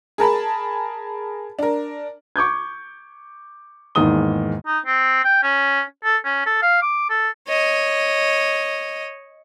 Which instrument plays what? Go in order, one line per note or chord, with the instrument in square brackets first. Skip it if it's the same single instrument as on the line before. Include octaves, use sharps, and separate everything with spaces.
[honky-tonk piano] G#4 A#4 A5 B5
D4 A#4
[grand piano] C#6 D6 G6 G#6
E2 G#2 D#3 A#3 D#6 G7
[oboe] D#4
C4
G5
C#4
A4
C#4
A4
F5
D6
A4
[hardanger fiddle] C#5 D#5